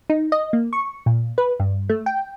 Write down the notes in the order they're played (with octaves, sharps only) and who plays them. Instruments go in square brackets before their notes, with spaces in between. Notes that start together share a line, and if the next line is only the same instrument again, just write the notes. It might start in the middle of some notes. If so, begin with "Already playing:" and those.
[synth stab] D#4
D#5
A#3
C#6
A#2
B4
G2
A3
G5